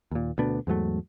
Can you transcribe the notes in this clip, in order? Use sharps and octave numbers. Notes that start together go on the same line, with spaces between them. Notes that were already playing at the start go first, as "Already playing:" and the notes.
D#2 A#2
D2 B2 B3 D4
E2 G#2 F#3 A3